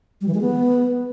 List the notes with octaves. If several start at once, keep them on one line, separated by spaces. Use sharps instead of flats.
G3
E3
G#3
B3